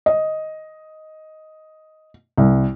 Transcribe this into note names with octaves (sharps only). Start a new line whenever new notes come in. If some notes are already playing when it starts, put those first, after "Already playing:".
D#5
C2